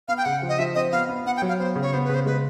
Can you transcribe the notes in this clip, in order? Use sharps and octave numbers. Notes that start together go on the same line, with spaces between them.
B3 F5
G5
C#3 F#5
F3
D#5
F3 E5
C4 D#5
B3 F5
B3
B3 F#5
G5
F#3
F5
B3 C5
C#3
C#5
B3 C5
C#3 B4
C5
G#3 B4